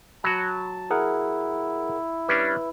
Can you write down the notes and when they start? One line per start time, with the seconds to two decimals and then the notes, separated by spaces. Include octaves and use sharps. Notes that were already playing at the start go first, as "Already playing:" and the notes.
0.24 F#3 F#4 A5 B5
0.91 E4 G#4 A#4 F#5
2.28 G3 C#4 D4 B4